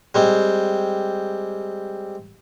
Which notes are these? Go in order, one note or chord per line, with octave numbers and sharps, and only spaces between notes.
G3 G#3 C4